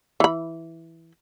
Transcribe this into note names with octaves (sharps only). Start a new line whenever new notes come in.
E3 B5